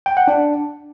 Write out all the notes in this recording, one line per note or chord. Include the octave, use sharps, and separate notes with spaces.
G5
F#5
D4